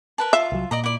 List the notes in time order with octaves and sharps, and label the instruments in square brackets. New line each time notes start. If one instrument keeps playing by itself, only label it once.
[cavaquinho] A#4 B4 A5
[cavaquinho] F4 [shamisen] E5
[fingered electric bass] C2 F#3
[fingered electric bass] A#2 [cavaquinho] D5 D#5 A#5
[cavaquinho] E4 D5